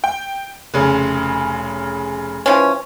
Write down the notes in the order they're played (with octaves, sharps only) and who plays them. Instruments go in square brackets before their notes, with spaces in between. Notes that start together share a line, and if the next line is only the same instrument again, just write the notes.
[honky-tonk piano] G5
F1 C#3
[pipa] E3 F3 C#4